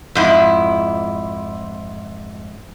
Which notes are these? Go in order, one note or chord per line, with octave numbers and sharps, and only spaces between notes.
F2 G#2 E4